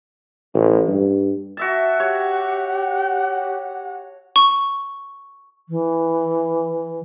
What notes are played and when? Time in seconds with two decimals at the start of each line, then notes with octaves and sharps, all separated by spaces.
0.54 A1
0.88 G2
1.57 F#4 E5 A5
2.00 G4 C#5 F#5
4.36 C#6
5.69 E3